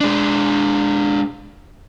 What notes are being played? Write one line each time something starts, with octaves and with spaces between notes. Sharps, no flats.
G#3 D4